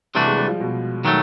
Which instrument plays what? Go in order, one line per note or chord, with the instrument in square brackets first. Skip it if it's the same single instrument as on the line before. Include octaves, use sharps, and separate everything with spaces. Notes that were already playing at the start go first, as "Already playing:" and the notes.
[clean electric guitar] C3 E3 A3 D4 F#4 [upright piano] G3
[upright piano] G#3
G3
F3
B2
[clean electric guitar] D#3 F#3 A3